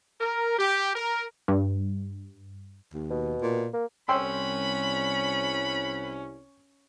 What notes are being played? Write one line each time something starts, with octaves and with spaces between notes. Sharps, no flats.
A#4
G4
A#4
G2
D#2
B2
A#2
A#3
C2 C#4 A#4 F#5 G5 B5 C6 E6